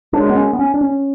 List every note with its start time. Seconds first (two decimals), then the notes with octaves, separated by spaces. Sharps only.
0.13 F#2 C#3 G#3 D4
0.29 B3
0.35 C#4
0.53 B3
0.59 C#4
0.74 D4
0.81 C#4